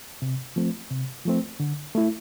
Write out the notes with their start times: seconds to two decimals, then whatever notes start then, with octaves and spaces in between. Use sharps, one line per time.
0.22 C3
0.56 F3 A3 C4
0.90 C3
1.25 F3 A3 C4
1.60 D3
1.95 A3 E4